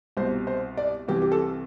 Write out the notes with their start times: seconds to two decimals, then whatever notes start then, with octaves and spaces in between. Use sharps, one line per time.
0.17 C2 B2 C5
0.47 C5
0.77 D5
1.08 C2 C3 E3 G4
1.22 G4
1.32 A4